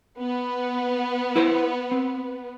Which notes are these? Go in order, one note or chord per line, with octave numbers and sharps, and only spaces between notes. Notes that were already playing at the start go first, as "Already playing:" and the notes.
B3
E4 B4 C5
C4